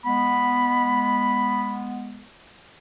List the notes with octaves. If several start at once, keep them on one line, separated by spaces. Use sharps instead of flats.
G#3 B3 B5